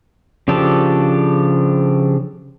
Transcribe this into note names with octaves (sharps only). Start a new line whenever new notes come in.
C#3 F3 D4 G4 A4